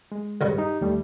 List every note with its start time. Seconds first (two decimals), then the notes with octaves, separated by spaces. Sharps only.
0.12 G#3
0.41 C#2 G2 C#3
0.58 D#4 G4
0.81 D#2 G3 A3